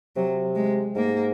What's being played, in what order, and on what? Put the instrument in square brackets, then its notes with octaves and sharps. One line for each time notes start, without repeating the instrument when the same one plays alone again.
[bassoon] C3 [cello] F#3
[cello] G#3
[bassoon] G#2 [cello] A#3